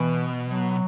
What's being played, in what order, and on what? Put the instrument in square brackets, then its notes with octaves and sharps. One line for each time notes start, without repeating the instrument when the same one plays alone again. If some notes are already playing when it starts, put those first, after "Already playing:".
Already playing: [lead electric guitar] B2 [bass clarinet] E3
[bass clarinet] F#3